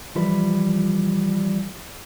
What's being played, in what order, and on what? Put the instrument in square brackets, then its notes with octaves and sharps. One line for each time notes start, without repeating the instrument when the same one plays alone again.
[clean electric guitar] E3 F3 G3 B4